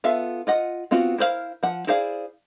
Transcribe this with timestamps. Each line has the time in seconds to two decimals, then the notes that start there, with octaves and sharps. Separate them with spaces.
0.04 B3 F4 A4 E5 F5
0.47 F4 D#5 F#5
0.91 B3 C4 F4 F#4
1.18 E4 A#4 C5 C#5 F5
1.63 F3 F#5
1.87 E4 G#4 C5 D5 F5